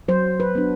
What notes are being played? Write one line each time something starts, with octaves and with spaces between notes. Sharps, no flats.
F#3 C5
B4
B3 D4